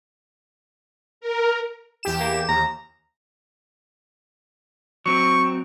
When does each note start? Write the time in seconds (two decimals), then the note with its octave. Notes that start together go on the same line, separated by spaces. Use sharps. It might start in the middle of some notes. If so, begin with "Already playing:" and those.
1.21 A#4
2.03 E2 G4 E7
2.20 A#3
2.49 D#2 A#5
5.06 F#3 C4 C#6